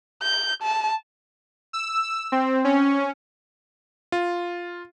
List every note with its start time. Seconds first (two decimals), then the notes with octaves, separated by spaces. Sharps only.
0.23 G6
0.63 A5
1.73 E6
2.32 C4
2.64 C#4
4.12 F4